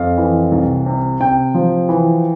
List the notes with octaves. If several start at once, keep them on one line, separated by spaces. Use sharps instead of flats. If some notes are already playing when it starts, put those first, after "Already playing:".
Already playing: F2 F5
E3
C2
C3
C3 G5
F3
E3